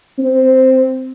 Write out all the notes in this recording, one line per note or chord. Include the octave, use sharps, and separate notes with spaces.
C4